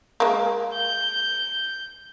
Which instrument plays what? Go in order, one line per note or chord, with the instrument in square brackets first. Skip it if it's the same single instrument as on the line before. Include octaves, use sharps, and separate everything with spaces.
[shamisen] G#3 A#3
[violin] G6